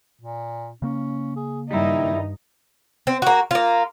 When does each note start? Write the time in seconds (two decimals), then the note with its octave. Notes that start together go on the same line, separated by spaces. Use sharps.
0.21 A#2
0.82 C#3 A#3 C#4
1.37 G#4
1.71 G2 D#3 G3 D#4 E4
3.07 C4
3.22 A#3 F#4
3.51 A#3 F4